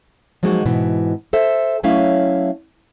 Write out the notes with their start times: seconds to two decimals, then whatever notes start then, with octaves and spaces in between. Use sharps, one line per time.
0.43 F3 F#3 G#3 A#3 D#4 F#4
0.65 G#2 B2 E3
1.33 A4 C5 E5
1.83 F#3 A3 C#4 E4 F5